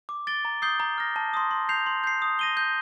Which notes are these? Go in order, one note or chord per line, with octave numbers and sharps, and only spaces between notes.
D6
A6 D7 G7
A#5
D#6 G6 C7 G7
A#5
F6 A#6
A5
C6 D#6
C6
G6 C7 F7
C6
G6 C7
D#6
A#6 D#7 G7
G6